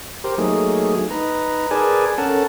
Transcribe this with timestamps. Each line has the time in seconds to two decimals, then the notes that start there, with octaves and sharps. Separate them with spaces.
0.24 G4 A#4 C5
0.38 F#3 A3 A#3 D#4 G#4
1.11 D#4 B4 A#5
1.71 G#4 A#4 B4 D5 G#5 A5
2.18 C#4 A4 A#4 F#5 A5